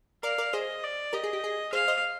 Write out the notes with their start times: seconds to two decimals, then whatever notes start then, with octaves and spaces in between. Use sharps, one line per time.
0.23 A#4 D5 F5
0.38 A#4 D5
0.53 G#4 C5 D#5
0.83 D5
1.13 G4 A#4 D#5
1.24 G#4
1.33 G4
1.44 G#4
1.73 G#4 C5 F5
1.88 C5 D#5